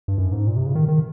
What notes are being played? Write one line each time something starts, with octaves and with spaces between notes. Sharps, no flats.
G2
F#2
G#2
A#2
C3
C#3
D#3
D#3